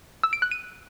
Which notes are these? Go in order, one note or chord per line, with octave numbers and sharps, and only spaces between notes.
E6
D7
F#6
D#7